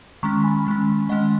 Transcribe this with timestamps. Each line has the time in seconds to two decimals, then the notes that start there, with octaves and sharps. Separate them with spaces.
0.23 D#3 G#3 C#4 A#5 C#6
0.44 G#5 B5
0.67 D#3 G#3 C#4
1.09 D#3 G#3 C#4 D#5 F#5